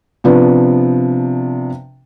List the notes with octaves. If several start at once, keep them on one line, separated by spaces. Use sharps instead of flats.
C3 F3 B3 D4